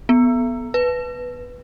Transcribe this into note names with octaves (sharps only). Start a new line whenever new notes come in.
B3
B4